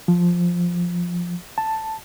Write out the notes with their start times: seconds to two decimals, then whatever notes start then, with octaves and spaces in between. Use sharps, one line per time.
0.08 F3
1.58 A5